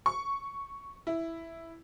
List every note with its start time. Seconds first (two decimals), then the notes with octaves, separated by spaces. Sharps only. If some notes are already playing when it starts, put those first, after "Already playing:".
0.06 C#6
1.07 E4